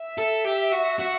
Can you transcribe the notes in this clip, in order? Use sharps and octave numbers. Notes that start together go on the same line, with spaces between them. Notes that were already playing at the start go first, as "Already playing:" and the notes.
Already playing: E5
A4
G4
F#4
F#4